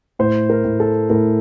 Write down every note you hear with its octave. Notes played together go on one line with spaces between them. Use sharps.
A2 C5
A#4
A2
A4
A2 A#4